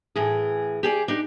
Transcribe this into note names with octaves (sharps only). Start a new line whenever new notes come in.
A2 E3 G#4
G4 G#4 D5
D4 D#4 G4